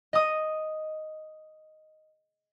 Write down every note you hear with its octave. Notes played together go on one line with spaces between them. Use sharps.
D#5 D#6